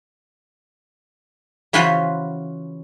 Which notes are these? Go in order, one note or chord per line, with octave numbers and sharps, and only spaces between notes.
C#3 E3 F4 F#4 B4 C5